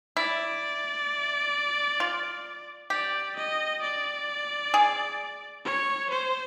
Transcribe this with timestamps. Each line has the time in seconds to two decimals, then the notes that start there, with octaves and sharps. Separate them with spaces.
0.17 E4 D5
2.00 F4
2.90 G4 D5
3.36 D#5
3.82 D5
4.74 G#4
5.65 C#5
6.10 C5